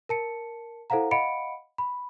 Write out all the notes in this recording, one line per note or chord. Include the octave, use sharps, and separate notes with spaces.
A#4 A5 C#7
E4 A4 C5 F5 F#5 A#5
D#5 F5 F#5 B5 C#7 D7
B5